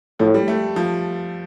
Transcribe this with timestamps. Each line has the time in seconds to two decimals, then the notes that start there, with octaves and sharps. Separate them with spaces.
0.20 A2 F3
0.34 G3
0.48 A3
0.76 F3